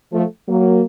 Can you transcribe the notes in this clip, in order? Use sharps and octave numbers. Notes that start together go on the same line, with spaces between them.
F3 A3
F#3 A#3